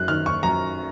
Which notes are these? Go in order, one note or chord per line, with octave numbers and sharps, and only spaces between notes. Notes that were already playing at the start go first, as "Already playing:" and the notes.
Already playing: F#2 F#6
D#3 F6
C#6
F#2 A#5